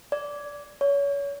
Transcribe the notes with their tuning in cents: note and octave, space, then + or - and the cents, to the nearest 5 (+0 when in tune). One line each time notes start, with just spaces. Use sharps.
D5 -15
C#5 +30